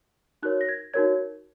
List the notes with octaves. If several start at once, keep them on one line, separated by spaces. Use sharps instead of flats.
D#4 F#4 A#4 C#5 F#6
A#6
G#6
D#4 F#4 A#4 C#5 G#6